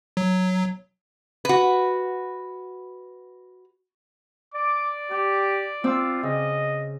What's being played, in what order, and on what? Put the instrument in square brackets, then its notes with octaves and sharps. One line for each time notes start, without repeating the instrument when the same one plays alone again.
[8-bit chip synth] F#3
[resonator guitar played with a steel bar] F#4 B4
[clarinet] D5 [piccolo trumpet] D6
[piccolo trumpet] G4 [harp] D6
[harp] C4 D6 E6 [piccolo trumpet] F4
[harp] C#3 [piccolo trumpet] D#5